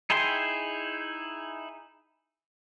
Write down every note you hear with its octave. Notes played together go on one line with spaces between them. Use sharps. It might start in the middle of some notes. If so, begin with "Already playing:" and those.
D#4 E4 G#4 G5 C6